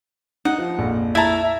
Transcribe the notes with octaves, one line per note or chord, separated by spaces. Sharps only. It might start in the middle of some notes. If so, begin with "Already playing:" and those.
D#4 F#5
F3
A#1 F2
E4 E5 A5 A#5